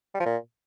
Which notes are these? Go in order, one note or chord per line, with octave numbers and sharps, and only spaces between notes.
G3
F3
A#2